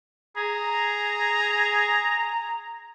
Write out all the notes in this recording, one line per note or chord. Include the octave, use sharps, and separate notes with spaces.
G#4 A#5